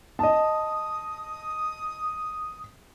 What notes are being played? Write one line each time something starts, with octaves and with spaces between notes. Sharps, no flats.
D#5 A5 D#6